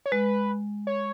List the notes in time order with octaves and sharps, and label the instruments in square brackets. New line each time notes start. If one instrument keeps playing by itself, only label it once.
[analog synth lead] C#5
[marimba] G#3 [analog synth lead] B4
[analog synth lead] C#5